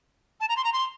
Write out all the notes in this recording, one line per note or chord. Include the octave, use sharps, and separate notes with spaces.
A5
A#5
C6
A#5
C6